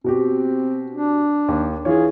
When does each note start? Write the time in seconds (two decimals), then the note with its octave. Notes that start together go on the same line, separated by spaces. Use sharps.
0.04 B2 C4 F#4 G4
0.90 D4
1.48 D#2
1.85 E3 F4 G#4 C#5